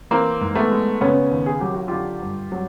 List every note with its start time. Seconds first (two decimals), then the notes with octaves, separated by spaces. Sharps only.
0.11 E3 A#3 C4
0.41 G#2
0.55 A3 B3
0.71 G#3
1.01 C#3 B3 C#4
1.31 D#2
1.46 G#4
1.60 F#3 G4
1.74 F#4
1.88 D3 F4 G4
2.22 G2
2.52 F#3